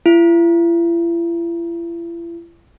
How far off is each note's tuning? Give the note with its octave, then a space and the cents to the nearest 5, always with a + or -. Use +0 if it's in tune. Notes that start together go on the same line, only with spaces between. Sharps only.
E4 +45